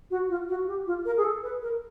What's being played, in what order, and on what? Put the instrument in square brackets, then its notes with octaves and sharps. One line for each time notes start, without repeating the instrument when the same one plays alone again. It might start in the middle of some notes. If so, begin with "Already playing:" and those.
[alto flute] F#4
F4
F#4
G4
F4
A#4
G#4
A4
B4
A#4